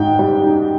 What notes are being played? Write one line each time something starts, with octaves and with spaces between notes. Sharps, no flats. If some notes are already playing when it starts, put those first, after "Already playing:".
Already playing: G#2 D#4 G5
G3
D#4